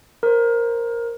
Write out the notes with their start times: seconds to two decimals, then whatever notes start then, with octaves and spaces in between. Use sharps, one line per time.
0.23 A#4 C5